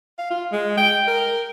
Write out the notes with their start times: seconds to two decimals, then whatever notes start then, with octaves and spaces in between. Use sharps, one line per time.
0.18 F5
0.30 F4
0.52 G#3
0.77 G5
1.07 A#4